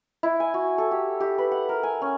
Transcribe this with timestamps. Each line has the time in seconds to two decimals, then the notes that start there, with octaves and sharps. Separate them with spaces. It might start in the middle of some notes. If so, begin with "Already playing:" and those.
0.23 E4
0.40 G#5
0.54 F#4
0.78 A4
0.91 G4
1.20 G4
1.38 B4
1.52 F#5
1.69 A#4
1.83 G#5
2.02 C#4